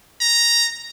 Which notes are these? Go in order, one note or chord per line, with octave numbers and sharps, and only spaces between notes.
A#5